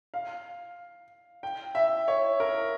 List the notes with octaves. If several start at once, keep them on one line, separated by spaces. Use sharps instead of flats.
F5
G5
E5
C#5
A#4